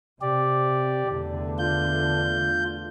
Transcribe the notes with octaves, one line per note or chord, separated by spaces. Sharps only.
C3 G4 D5
E2 D3 A3
F4 G6